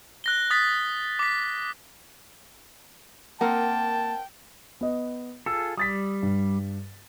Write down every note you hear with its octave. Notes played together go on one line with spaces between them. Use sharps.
F#6 A#6 G7
D#6 A6 B6
D6 B6
A#3 C4 A#4 F#5 G5 A5
B3 D#5
F4 G#4 A4 E6
G3 D#6 A6 B6
G2